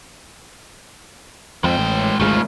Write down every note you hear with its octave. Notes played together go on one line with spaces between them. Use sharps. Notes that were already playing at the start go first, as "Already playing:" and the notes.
F2 G#3 G5
A1
G#1 D2 G#3 A3 F4